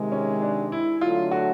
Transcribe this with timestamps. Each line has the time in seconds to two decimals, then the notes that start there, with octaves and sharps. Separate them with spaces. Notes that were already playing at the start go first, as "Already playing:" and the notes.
Already playing: C3 D#3 G#3
0.12 C#4
0.42 D4
0.72 E4
1.01 D3 F#3 A3 F4
1.31 F#4